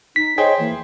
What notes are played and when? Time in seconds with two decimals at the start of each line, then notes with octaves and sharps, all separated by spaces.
0.16 D#4 B6
0.38 G#4 C5 C#5 D#5 G5
0.59 E3 A#3